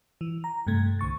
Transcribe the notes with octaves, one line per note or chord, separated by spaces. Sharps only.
E3
A#5
G2 C3 A3 G#6
C2 D3 C#6 A6